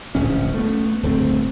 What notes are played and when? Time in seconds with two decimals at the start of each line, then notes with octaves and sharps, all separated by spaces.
0.15 D1 A#1 G#2 C#4
0.55 A3 B3
1.03 D1 G1 A3 C4